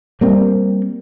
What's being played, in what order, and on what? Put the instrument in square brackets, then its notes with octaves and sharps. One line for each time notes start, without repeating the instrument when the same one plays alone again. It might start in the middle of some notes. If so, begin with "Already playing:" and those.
[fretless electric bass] G3 A#3 C4